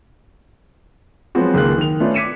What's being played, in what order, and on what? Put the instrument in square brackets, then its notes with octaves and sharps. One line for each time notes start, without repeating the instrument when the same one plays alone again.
[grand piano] F3 F#3 G#3 B3 C4 F#4
C#2 D#3 G#3 A#3 F#6
D#3 F7
A3 B3 C#4 D4 F4
D6 G#6 B6 C#7 D#7 E7